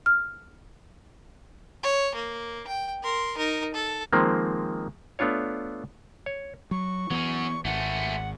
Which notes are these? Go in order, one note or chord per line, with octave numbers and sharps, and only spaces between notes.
F6
C#5
A#3
G5
A#4 C6
D#4 A#4
A4
D#3 F3 G#3 A#3 C4
A3 B3 D4 F4 C#5
C#5
F#3 C#6
E3 F#3 B3 C#4
G#1 A3 C#4 F#5